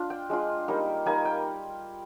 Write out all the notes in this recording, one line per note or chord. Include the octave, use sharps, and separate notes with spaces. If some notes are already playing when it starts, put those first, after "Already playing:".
Already playing: D4 F4
G5
G#3 D4 F4
G3 A#3 D#4
G3 A#3 D#4 G#5
G5